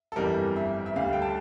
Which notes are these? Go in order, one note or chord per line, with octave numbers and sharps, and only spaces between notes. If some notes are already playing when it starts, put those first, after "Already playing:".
A4
G1 F2 E3 G3 A#4
E5
E5
D2 D3 G3 F5
G5
A5